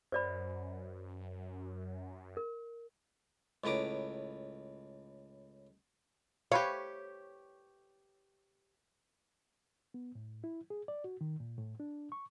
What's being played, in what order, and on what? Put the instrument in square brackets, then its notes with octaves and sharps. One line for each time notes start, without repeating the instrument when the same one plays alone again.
[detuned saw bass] F#2 [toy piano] C5 D5 B5
[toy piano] A#4
[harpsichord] C#2 A2 B4 A#5 D6
[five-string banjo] G4 B4 F5 [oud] C#5
[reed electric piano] B3
A2
E4
G#4
D5
F#4
D#3
A#2
A2
D4
C#6